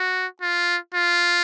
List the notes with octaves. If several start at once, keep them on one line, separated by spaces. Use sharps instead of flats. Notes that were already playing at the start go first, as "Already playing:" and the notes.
Already playing: F#4
F4
F4